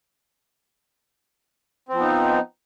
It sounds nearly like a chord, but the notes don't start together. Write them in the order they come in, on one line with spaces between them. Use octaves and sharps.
C4 F3 B3 D#4